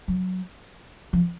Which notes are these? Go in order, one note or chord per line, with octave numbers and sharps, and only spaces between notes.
F#3
F3